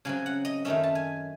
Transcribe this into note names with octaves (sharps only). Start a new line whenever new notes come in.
C#3 F#3 C4 G#5
F#5
D#5
F#2 D#3 A3 C#4 E5
A5
G#5